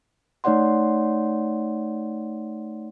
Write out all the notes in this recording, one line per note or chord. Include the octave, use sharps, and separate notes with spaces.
A3 D#4 C#5 D5 F#5 C6